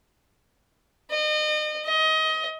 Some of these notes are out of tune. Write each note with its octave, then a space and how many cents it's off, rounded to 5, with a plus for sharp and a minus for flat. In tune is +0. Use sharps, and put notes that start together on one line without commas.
D#5 -35
D#5 +25